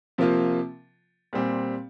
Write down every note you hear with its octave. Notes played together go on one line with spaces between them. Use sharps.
C3 F3 A#3 F4
A#2 G3 C4 G4